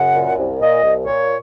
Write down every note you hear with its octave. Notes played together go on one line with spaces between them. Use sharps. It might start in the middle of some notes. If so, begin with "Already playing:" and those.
Already playing: F#2 C#3 F#5
A#2
C2
A#2 D#5
C2
A#2 C#5